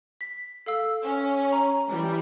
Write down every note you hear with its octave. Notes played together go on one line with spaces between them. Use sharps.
B6
A4 F5 E6
C#4
A#5
E3 G3